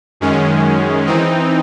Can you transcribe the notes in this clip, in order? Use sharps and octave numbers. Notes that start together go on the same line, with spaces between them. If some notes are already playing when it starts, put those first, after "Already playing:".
F#2 D#3 G#3 C#4
E3 C4 D#4